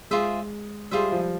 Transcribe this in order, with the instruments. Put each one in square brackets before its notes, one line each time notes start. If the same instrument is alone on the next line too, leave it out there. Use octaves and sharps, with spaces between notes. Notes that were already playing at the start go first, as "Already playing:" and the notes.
[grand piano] G#3 [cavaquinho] F4 G#4 C5 E5
[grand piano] G3 [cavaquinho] F4 G#4 C5 E5
[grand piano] F3